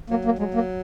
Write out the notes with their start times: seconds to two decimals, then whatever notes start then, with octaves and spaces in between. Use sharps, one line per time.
0.10 F#3 A#3
0.25 A#3
0.39 F#3 G#3
0.54 A#3